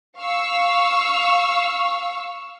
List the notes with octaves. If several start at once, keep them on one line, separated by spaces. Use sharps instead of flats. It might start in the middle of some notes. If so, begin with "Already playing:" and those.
F5 C#6 E6